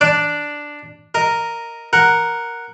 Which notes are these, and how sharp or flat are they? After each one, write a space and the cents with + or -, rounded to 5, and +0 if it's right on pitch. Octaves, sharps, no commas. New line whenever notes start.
D4 +0 D5 +0 D6 +0
A#4 -5 D#5 +0
A#4 +0 F#5 +0